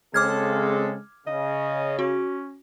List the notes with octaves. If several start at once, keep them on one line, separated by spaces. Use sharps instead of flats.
C#3 G#3 C4 A4 D6 F6 G#6
C#3 D#5
C#4 F#4